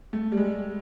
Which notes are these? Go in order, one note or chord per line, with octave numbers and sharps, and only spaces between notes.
A3
G3
G#3